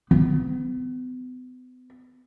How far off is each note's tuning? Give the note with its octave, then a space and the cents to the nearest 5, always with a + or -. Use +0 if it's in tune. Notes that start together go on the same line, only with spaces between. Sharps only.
B3 +40